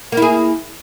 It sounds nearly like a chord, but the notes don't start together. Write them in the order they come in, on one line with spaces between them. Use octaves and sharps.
A#3 E4 G#4